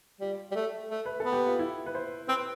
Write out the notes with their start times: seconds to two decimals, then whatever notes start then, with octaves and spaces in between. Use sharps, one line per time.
0.21 G3 F4
0.51 G3
0.56 A3
0.90 A3
1.06 B4
1.20 B3 A4
1.32 G4
1.47 F4
1.59 E4
1.86 B4
1.95 C5
2.28 C4 B4